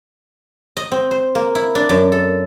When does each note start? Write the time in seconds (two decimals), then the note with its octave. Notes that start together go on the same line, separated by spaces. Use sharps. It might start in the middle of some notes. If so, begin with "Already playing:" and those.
0.77 D#5
0.91 C4
1.11 C5
1.35 A#3
1.55 E4
1.75 D4
1.89 F#2
2.12 A4